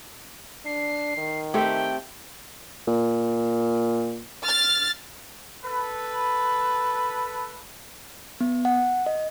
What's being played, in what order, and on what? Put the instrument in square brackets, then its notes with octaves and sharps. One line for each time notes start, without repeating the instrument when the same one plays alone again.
[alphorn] D4 [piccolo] C7
[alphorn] D#3
[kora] A3 C4 G4 [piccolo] G5
[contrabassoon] A#2
[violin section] F6 A6
[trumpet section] A4 B4
[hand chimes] B3
F#5
D#5